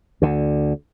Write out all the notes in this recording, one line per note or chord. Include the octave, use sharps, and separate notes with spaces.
D2 D3